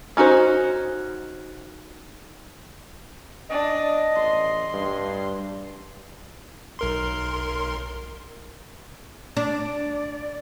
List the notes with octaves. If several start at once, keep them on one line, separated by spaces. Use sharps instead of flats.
C#4 D#4 F#4 A#4 C5
D4 D#5
A1 C6
G2
B1 A#4 C6
D4 D5